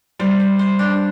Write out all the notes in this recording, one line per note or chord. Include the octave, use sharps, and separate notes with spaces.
G3 C5
C5
C5
D4